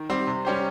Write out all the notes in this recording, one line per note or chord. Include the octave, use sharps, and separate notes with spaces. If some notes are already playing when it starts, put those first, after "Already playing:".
Already playing: D#3
G3 C4 G4
C3
G3 C#4 G4 C5